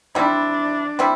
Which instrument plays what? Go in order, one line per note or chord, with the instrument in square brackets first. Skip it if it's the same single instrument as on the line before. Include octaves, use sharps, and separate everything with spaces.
[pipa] G3 C4 E4 [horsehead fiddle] D4
[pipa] G3 C4 E4